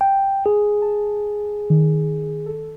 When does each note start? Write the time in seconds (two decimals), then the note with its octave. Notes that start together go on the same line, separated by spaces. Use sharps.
0.01 G5
0.46 G#4
0.82 A5
1.70 D#3
2.46 A4